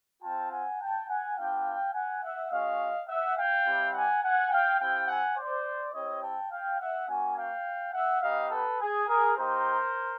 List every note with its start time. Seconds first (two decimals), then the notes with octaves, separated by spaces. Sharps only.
0.21 C4 F4 G5 A5
0.50 F#5 G#5
0.79 G5 A5
1.07 F#5 G#5
1.36 B3 D4 F4 F5 G5
1.93 F#5 G#5
2.22 E5 F#5
2.50 G#3 C#4 F#4 D#5 F5
3.07 E5 F#5
3.37 F5 G5
3.64 G3 C4 E4 G4
3.93 F#5 G#5
4.22 F#5 G#5
4.51 F5 G5
4.79 C4 E4 G4 F5 G5
5.07 F#5 G#5
5.36 C5 D5
5.93 C4 E4 G4 C#5 D#5
6.21 G5 A5
6.50 F5 G5
6.79 E5 F#5
7.07 A#3 C#4 F#4 F#5 G#5
7.36 F5 G5
7.93 E5 F#5
8.22 B3 D#4 G4 D#5 F5
8.50 A4 B4
8.80 G#4
9.07 G#4 A#4
9.36 A#3 D#4 G4 A#4 C5